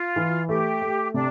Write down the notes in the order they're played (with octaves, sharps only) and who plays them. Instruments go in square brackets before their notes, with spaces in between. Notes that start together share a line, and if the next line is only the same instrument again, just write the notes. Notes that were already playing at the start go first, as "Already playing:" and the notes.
Already playing: [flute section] F4
[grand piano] E3
[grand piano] A3 [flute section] G4
[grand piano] A3
[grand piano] C3 [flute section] D4